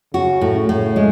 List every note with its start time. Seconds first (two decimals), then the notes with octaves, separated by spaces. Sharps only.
0.14 C#3 F#4
0.41 A2
0.55 C#3
0.69 A2
0.96 G#3